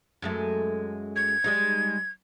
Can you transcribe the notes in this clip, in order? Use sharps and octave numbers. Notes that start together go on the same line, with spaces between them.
F#2 G#3 A3
G#6
G3 G#3 D#4